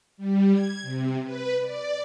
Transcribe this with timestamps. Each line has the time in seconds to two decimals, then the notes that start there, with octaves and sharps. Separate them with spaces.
0.17 G3
0.52 G#6
0.82 C3
1.24 B4
1.61 D5